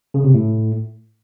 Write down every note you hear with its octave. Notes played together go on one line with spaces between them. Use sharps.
C#3
C3
A2